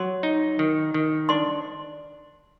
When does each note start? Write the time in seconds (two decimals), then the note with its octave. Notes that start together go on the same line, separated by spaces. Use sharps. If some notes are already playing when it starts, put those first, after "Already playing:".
Already playing: F#3 C6
0.23 D#4
0.59 D#3
0.94 D#3
1.29 D4 C6